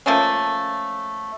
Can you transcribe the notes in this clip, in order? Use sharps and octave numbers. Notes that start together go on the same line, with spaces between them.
F3 A3 A#3 C#4